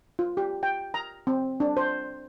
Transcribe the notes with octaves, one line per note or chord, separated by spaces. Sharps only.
F4
G4
G5
A#5
C4
D4
C5